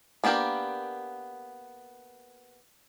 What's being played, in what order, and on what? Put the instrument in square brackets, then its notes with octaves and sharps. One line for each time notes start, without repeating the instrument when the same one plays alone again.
[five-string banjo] A#3 B3 D4 G4 A#4